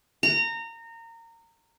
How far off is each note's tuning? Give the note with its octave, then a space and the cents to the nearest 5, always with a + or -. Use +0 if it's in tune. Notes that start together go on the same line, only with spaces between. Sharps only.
A#5 -25